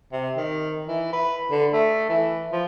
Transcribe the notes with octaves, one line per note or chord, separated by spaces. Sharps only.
C3
D#3
E3
B4
D3
A3
E3
F3